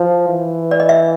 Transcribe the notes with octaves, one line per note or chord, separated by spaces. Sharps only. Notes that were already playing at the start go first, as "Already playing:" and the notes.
Already playing: F3
E3
D5
D#5
E5